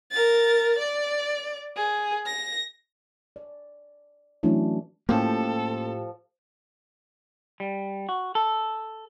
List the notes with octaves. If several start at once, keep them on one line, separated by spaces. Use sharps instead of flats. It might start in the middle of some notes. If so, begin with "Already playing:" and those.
A#4 A6
D5
G#4
A#6
D5
E3 F#3 A3 C#4 D4 E4
A2 F3 A#3 C#4 F4 G4 A4
G3
F#4
A4